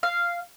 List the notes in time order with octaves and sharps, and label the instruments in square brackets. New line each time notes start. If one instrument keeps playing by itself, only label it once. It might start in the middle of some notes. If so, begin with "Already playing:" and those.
[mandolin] F5